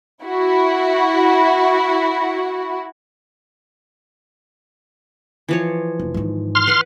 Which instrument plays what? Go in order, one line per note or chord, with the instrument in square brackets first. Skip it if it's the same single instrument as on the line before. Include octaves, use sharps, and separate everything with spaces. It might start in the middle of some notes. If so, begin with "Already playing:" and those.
[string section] E4 F#4
[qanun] E3 F3 C#5
[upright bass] F1
G#2 D#3
[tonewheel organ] C6 F6
[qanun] B4 F#5